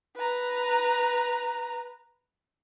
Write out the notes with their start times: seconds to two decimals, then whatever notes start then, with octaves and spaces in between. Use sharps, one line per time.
0.16 B4 A#5